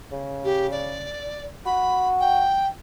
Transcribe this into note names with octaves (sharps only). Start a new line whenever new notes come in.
C#3
G4
D5
F#4 B5
G5